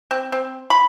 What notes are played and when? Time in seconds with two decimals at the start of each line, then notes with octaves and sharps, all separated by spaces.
0.11 C4
0.32 C4
0.70 B5